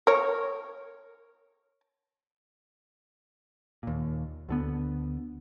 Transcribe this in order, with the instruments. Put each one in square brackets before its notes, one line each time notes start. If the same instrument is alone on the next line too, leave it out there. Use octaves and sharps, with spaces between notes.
[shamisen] A#4 C#5
[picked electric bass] D#2 A#2
D2 D3 B3